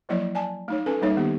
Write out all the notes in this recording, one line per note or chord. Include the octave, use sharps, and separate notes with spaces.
F3 F#3 A#3 E4 C#5 D5
D5 G#5 A5
A3 D#4 C#5
C#4 A4 B4 G#5
G3 A3 A#3 D#4 C#5 E5
D#3 A#3 B3 G4